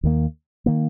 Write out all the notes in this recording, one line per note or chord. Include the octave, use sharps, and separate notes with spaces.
D#2 D#3 A#3
D#3 A#3